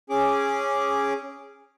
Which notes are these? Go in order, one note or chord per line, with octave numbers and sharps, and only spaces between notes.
C#4 G#4 D6